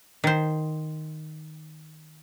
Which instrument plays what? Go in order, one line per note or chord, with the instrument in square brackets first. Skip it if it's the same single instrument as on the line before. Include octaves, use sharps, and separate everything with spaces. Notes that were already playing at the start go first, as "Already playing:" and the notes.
[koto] D#3 C5